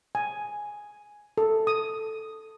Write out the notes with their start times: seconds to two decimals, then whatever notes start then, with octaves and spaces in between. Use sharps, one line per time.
0.15 G#5
1.38 A4
1.67 D#6